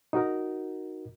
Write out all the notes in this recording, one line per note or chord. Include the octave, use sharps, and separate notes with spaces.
D#4 F#4 A#4